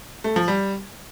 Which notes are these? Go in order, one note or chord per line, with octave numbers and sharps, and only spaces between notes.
A3
F3
G3